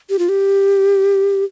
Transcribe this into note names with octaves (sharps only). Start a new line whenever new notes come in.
G4
F4
G4